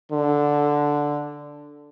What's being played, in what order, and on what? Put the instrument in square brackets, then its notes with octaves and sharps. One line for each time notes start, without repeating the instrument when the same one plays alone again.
[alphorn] D3